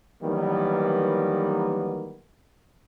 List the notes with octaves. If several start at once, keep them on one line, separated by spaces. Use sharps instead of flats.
D#3 E3 F#3 G3 A#3 B3